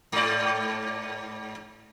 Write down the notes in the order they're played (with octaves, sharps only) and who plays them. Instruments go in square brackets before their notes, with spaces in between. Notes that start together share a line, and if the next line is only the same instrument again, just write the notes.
[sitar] G#2 D5